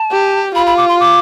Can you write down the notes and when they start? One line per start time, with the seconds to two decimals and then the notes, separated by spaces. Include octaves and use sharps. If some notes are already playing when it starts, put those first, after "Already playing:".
Already playing: A5
0.12 G4
0.55 F4 B5
0.66 B5
0.77 D6
0.88 C6
1.00 D6